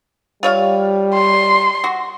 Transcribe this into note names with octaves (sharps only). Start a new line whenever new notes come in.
G3 F4 C#5 F5
C6
F#4